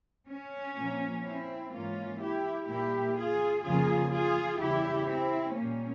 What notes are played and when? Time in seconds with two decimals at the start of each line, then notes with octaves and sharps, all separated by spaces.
0.29 C#4
0.76 A#2 F3 A#3
1.24 C4 E4
1.72 G#2 E3 A#3 C#4 F4
2.20 E4 G4
2.68 A#2 G3 A#3 E4 G4
3.16 F4 G#4
3.64 F2 C#3 F3 A#3 F4 G#4
4.12 F4 G#4
4.59 E2 C#3 G3 E4 G4
5.08 C4 E4
5.55 A#2 G3 A#3 C#4